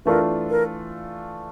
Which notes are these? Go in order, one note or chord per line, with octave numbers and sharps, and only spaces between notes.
E3 A3 D4 F4 A#4
A#4